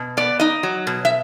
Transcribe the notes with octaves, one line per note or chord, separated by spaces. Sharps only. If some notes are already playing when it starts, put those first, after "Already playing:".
Already playing: B2
B3 D5
D#4 D#5
F#3
B2
E5